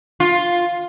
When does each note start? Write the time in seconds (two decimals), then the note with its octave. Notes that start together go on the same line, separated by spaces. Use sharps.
0.20 F4